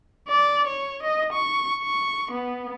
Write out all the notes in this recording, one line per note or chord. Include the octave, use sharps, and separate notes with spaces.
D5
C#5
D#5
C#6
C#6
B3